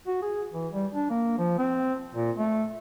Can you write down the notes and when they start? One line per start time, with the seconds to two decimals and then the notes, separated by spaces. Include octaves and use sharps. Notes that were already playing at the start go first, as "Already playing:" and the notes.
0.07 F#4
0.22 G#4
0.53 E3
0.72 G3
0.95 D4
1.10 A#3
1.38 F3
1.58 C4
2.15 A#2
2.38 A3